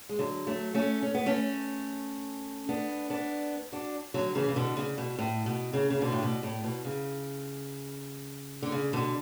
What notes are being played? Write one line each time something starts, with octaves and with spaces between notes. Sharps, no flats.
G#3
D3 F#3
F#3 A3
A3 C#4
C#4
B3
A3 C#4
B3 D4
B3 D4
D4 F#4
D3 F#3
C#3 E3
C#3
B2 D3
C#3
B2
A2
B2
C#3
C#3
B2 D3
A2
B2
A2
B2
C#3
D3
C#3
B2 D3